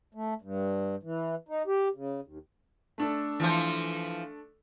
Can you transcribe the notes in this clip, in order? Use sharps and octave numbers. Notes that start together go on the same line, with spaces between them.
A3
G2
E3
D#4
G4
C#3
D#2
A3 D4 A4
E3 F3 C5